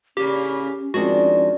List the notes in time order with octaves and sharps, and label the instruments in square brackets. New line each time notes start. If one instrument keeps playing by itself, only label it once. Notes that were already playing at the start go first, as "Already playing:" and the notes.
[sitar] A2 C#3 A#3 [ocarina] C#4 [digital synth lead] G4
[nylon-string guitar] F2 D#3 G#3 [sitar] D4 [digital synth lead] F#4